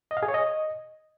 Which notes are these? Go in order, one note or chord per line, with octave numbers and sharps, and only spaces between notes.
D#5
F5
G#4
C#5
D#5